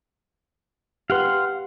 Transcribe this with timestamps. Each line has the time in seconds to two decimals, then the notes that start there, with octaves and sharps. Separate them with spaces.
1.10 G4 B4 F5 F#5 C6